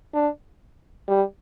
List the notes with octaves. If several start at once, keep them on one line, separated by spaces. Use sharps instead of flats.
D4
G3